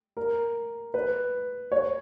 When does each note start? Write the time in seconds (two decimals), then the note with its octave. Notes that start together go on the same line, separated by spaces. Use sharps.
0.17 A#4
0.94 B4
1.72 C#5